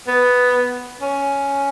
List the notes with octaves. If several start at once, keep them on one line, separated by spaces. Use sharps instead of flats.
B3
C#4